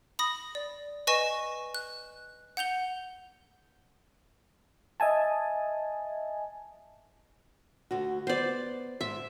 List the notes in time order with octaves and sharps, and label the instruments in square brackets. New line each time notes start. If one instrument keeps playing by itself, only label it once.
[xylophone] B5 D#6 A#6
D5
B4 D#5 G#5 C#6 A#6 E7
F#6
F#5 G6 F7 G7
[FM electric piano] D#5 E5 G#5 A5
[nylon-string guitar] D2 F#4
[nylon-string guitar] B3 [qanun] C5 D5
[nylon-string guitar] G#2 [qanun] E5